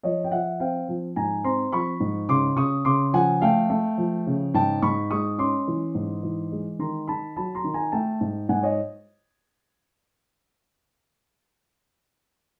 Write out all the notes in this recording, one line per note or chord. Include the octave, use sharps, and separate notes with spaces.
F3 C#5 D#5
G5
F3 E5 F#5
C4 F5 G5
F3
G#2 G#5 A#5
C4 A#5 C6
F3 B5 C#6
G#2
C#3 C6 D6
C#3 C#6 D#6
C#3 C6 D6
F3 F#5 G#5
A3 F5 G5
A3
F3
C#3
G#2 G5 A5
G#2 B5 C#6
G#3 C#6 D#6
C#4 C6 D6
E3
G#2
E3
G#3
D#3 A#5 C6
D#3 A5 B5
F#3 A5 B5
A#5 C6
D#3
G#5 A#5
A3 G5 A5
G#2
G#2 F#5 G#5
C#5 D#5